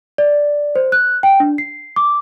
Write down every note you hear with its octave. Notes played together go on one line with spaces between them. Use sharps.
D5
C5
F#6
G5
D4
C7
D6